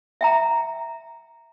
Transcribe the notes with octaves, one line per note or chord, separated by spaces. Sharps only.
E5 G5 A#5